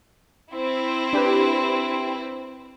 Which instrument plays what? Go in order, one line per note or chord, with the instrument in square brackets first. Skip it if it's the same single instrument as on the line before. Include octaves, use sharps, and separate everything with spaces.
[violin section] C4 E4
[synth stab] D4 G4 B4